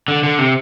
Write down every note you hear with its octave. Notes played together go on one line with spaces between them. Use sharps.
D3
D3
C3